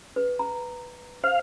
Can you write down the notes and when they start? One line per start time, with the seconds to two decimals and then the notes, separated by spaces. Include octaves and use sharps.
0.16 B4
0.39 A#5
1.24 C5 F5